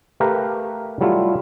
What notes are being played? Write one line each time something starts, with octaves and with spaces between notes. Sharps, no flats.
A3 G4 A#4 B4 F5 A#5
F#3 G3 A3 E4 F4